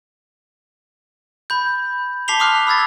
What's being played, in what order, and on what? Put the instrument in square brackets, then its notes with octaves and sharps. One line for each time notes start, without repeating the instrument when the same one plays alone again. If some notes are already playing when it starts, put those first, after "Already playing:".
[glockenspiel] B5 G6
A5 D6 B6 C7 F7 G7
C6 D6 D#6 F6 F#6 C7
B5 E6 G#6 A6